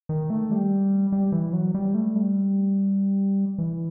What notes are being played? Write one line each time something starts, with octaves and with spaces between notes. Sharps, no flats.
D#3
A3
G3
G3
E3
F#3
G3
A3
G3
E3